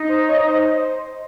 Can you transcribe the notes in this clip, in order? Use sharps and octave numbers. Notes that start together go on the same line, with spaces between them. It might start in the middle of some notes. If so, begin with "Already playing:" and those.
Already playing: D#4 D#5
C5
C#5
C5